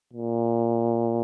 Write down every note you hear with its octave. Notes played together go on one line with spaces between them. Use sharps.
A#2